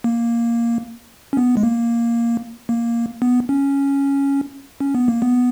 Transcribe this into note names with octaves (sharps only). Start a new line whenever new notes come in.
A#3
C#4
B3
G#3
A#3
A#3
B3
C#4
C#4
B3
A#3
B3